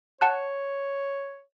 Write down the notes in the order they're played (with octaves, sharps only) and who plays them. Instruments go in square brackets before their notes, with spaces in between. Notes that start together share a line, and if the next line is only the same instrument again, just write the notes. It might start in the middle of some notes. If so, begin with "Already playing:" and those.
[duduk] C#5 [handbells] F#5 A5 F#6